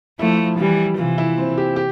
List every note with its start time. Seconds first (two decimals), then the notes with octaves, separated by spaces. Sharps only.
0.19 F3 A3 E4
0.59 E3 G3
0.98 C3 E3 F4
1.18 E4
1.38 C4
1.58 G4
1.76 G4